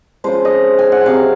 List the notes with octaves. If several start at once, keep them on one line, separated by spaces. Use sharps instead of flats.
C#3 F3 G#3 C5
D#5
G#5
F#5
C3 F#3 F5